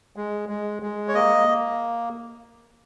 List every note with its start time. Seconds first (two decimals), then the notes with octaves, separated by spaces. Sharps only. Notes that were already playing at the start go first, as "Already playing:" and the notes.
0.16 G#3
0.49 G#3
0.82 G#3
1.08 C#5
1.14 A#3 D#5
1.48 A#3